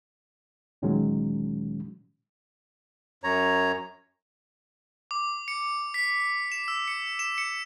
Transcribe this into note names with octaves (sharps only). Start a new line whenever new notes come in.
D2 A#2 D#3 F#3 G#3 C#4
F#2 C#5 A#5
D6
C#7
B6
E7
E6
C#7
E7
C#7